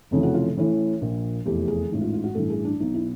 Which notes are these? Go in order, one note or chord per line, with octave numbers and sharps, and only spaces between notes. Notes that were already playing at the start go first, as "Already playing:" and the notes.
F1 F2 C#3 E3
F#4
F4
A1 A2 E3
A#1 A#2
F1 E2 C3 G4
G#4
A1 G#2 E3
F4
F4
F#4
A1 G2 E3 A4
G#4
D4
B1 B2 D#4
E4